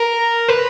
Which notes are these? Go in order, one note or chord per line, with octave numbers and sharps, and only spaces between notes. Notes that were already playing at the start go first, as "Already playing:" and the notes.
Already playing: A#4
B4